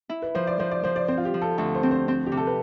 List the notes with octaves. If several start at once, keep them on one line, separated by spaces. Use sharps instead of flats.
E4
B4
F3 C5
D5
F3 C5
D5
F3 C5
D5
C4 C5
F4
G4
F3
A4
D2 A4
C5
C4
C5
C4
G4
C3
A4
B4